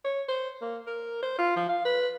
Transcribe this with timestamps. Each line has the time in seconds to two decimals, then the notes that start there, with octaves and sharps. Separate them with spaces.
0.05 C#5
0.29 C5
0.62 A#3
0.87 A#4
1.23 C5
1.38 F4
1.56 F3
1.69 F5
1.85 B4